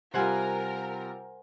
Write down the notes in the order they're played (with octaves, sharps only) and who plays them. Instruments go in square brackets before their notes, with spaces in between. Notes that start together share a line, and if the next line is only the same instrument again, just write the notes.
[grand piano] C3 G3 F4 [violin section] A#4 [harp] C5 F#5 G#5